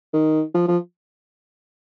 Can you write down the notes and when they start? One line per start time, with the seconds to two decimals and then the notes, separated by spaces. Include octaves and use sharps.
0.14 D#3
0.55 F3
0.68 F3